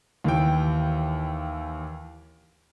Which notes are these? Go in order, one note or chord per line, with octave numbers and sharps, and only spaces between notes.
D#2 E3 G5